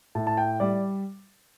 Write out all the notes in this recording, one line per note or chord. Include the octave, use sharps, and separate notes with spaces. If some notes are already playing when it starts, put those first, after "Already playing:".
A2 A5
A5
G5
G3 D5